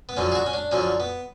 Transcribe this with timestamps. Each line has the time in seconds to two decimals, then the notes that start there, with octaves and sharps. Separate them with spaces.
0.09 B3
0.17 F#2 D3 F3 C#4
0.32 G#4
0.35 F#4
0.46 C#4
0.53 D4
0.71 F#2 D3 F3 C#4
1.00 B3